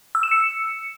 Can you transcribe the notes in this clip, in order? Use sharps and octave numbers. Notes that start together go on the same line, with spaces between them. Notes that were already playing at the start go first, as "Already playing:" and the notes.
E6
E7
C#7